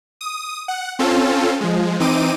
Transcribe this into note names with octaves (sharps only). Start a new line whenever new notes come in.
D#6
F#5
C4 C#4 F4 A4
F3 G#3
E3 C4 D#4 D6 D#7